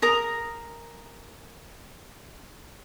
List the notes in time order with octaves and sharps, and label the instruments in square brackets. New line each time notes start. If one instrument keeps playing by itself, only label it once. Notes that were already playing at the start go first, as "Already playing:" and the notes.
[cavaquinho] G#4 A#4 A#5 D#6